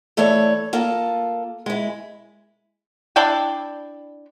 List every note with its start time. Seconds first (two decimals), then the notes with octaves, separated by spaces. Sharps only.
0.17 E3 A3 A4 C#5 D5
0.73 A#3 F4 A4
1.66 G#3 E4
3.16 D4 E4 D5 G5